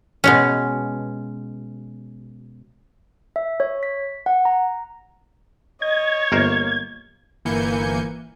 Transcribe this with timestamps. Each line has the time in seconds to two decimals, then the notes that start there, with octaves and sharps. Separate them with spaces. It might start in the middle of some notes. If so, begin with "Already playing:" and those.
0.24 B2 G#3 C#4
3.36 E5
3.60 C#5
3.83 B6
4.26 F#5
4.45 A#5
5.82 C#5 D#5 G#6
6.32 G1 A#3 A#4 C5
7.45 G1 E3 A#3 G#5 G6 C#7